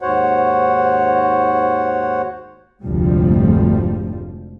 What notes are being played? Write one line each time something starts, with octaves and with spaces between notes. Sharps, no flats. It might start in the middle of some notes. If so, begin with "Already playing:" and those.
D#2 G#2 F#4 C5 C#5 F#5
F1 D2 G#2 F3 G3